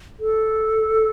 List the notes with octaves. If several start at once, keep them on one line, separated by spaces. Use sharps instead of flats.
A4